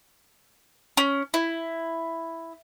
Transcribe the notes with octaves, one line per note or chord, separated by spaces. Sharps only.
C#4
E4